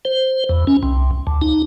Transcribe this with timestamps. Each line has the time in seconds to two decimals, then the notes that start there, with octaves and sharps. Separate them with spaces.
0.05 C5
0.49 E2
0.67 C#4
0.83 C2
1.27 D2
1.42 D#4